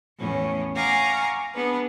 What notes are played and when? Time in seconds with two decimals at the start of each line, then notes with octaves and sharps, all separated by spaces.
0.19 E2 A2 C#4
0.76 F5 F#5 G#5 A#5 C#6 D6
1.54 B3 D4 G#4 B4